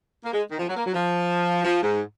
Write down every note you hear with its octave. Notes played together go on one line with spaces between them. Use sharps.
A#3
G#3
D#3
F3
F#3
A#3
F#3
F3
F3
G#2